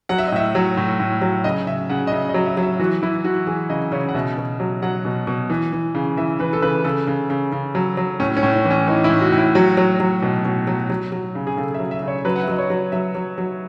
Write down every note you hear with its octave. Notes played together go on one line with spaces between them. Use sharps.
F#3 F#5
E5
D#5
A2 E5
F#3
A2
A2
F#3
C#3 D#5
C#3 E5
C#3 F#5
D#5
C#3 E5
D#5
F#3
E5
F#3
E5
E3 F#4
E3 E4
E3 F#4
E3 G#4
C#3 D#5
C#3 C#5
F#5
B2 E5
B2
F#3
F#3 F#5
B2
B2
E3
E3
C#3
E3 E5
E3 B4
A4
C#3 B4
C#3 A4
C#3
C#3
C#3
F#3
F#3
A2 C#4
C#4
A2
C#4
E3
C#4
E3 D#4
E4
A2
F#4
A2
E4
F#3 F#4
F#3
F#3
B2
B2
F#3
F#3
F#3
C#3
G#4
C#3 A4
E5
F#3
E5
C#3
C#5
F#3 B4
F#5
E5
F#3 D#5
C#5
F#3
F#3 E5
F#3
F#3